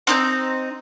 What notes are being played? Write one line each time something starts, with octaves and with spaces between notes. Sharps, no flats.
C4 D#4 G6